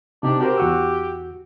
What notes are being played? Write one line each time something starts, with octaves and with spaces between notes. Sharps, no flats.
C3 D4 D#4 G4
F#4 G4 A#4 C5
E2 F#4 E6